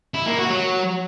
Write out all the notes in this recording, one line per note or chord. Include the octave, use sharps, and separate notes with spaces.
E4
A#3
F#4
F#3